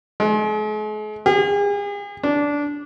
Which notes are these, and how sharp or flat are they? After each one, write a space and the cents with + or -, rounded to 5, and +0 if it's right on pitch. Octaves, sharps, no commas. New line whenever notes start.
G#3 +45
G#4 -40
D4 -15